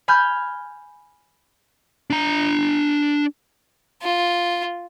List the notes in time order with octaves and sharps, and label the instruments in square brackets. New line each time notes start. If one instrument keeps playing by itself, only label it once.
[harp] G#5 B5 F6 G6 G#6
[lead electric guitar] D4 A#5
[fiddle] F4